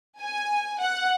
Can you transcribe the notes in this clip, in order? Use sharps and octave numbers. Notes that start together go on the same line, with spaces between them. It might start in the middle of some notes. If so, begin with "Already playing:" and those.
G#5
F#5